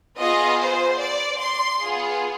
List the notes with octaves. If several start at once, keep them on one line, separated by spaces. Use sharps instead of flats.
B3 F4 G#4 D#5
C5
D5
C6
B3 F4 G#4